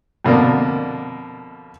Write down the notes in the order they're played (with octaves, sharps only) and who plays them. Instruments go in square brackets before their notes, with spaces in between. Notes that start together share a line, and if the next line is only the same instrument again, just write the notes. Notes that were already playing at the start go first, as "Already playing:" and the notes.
[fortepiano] F2 B2 D3 A#3 D5